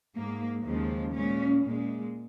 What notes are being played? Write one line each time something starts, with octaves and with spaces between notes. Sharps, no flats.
G#2 G#3 A#3
D#2 C#3 F3 G#3
A#2 G#3 C#4
A#2 G#3